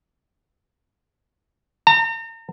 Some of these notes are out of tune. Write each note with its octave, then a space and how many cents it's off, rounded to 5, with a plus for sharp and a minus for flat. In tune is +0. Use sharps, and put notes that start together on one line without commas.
A#5 -40